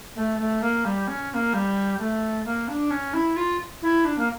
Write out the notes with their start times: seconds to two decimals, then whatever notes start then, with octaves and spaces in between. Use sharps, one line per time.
0.16 A3
0.38 A3
0.61 A#3
0.85 G3
1.08 C#4
1.30 C#4
1.34 A#3
1.53 G3
1.99 A3
2.45 A#3
2.68 D4
2.90 C#4
3.14 E4
3.36 F4
3.82 E4
4.05 D4
4.18 A#3